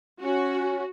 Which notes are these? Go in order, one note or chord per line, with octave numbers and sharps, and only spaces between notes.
C#4 F#4